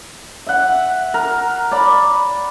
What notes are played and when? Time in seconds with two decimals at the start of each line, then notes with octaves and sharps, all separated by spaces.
0.47 E5 F#5
1.14 A#4
1.71 D5 B5